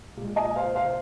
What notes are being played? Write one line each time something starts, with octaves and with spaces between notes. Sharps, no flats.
A#2 G#3
D#5 G#5
C5 F5
C5 F5